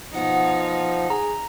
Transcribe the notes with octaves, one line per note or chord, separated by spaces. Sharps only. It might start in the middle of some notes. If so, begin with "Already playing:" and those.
B2 F3 B3 D#4 F#5
G#4 A#5